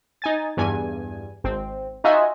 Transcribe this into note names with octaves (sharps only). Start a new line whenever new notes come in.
D#4 G#5 A6
E2 G2 G#5
G#1 C4
D#4 F4 F#4 D#5 E5 G#5